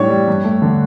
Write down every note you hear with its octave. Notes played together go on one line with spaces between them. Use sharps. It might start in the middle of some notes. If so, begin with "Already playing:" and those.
Already playing: A2 G3 D4 C#5
G3
G2
A3
D3